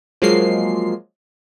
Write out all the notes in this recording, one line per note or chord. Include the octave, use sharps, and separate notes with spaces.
F3 F#3 G#3 A#3 C7